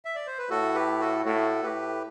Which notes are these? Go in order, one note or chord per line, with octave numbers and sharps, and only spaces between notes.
E5
D5
C5
B4
A2 F#4 A4
G4 B4
F#4 A4
A2 F#4 A4
A2 G4 B4